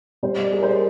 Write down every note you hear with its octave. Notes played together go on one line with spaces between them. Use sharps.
G3 C5
D#5
D5
G#4
A#4
C5